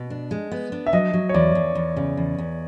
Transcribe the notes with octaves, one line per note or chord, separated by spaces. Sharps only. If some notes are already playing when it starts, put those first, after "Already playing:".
Already playing: B2
D4
G#3
B3
D4
E5
F#3 D#5
F#3
C#5
E2 D5
E2
E2
C#3
E2
E2